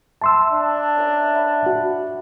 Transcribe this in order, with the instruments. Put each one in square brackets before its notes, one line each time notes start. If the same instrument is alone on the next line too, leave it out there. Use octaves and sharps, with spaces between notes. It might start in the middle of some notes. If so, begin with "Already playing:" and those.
[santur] E5 [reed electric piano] A5 C6 E6
[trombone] D4
[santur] C#4 A#4 E5
B4 E5 F#5
[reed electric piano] F#4 [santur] F#5